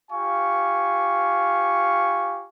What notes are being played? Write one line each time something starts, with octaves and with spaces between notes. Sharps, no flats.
F4 G4 F5 G#5 C#6